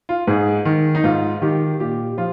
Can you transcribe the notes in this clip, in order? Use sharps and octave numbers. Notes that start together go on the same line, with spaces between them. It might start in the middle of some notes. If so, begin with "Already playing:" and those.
F4
G#2 G#4
D#3
D#4
G#2 F4
D#3 G4
A#2 G4
F3 F4